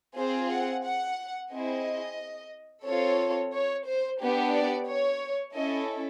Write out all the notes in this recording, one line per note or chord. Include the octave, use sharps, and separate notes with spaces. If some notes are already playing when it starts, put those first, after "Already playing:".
C4 F4 G#4 C5
F#5
F#5
C4 E4 G#4 D#5
C4 F4 A4 C#5
C#5
C5
B3 D4 G4
D5
C#5
C#4 E4 A4 D#5